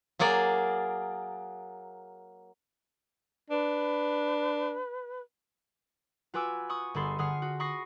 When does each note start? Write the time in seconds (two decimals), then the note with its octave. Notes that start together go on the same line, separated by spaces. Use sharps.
0.19 F#3 A#3 G#4 D5
3.50 D4 B4
6.34 F4 F#4 B4 G#5 D6 E6
6.69 B5 C#6 D#6
6.94 G1 G#4 A4 B5 C6 C7
7.18 D3 G#4 F#5 D#6 F6 C7
7.42 F#4
7.60 B5 C#6 D#6 A#6 C7